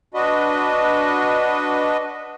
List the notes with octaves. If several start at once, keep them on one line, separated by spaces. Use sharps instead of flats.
D4 F#4 B4 D#5